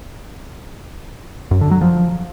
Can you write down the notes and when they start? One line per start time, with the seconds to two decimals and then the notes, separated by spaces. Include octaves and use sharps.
1.51 F#2
1.61 D3
1.71 F#3
1.81 F3